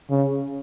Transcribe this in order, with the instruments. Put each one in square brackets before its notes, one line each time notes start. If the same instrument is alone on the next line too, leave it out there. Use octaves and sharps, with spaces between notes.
[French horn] C#3